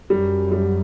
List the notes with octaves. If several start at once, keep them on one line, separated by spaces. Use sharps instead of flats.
F#2 G3
G3